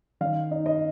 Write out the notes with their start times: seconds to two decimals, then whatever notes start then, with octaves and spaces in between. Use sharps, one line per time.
0.21 D#3 F5
0.51 D#4
0.66 D#5